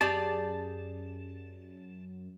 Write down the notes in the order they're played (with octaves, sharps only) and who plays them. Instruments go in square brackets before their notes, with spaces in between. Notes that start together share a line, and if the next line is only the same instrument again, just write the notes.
[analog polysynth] F#2 [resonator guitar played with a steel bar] G4 G#4 D5 [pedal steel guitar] A5